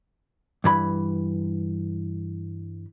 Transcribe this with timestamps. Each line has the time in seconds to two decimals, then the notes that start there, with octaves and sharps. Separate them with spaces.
0.64 G2 E3 B5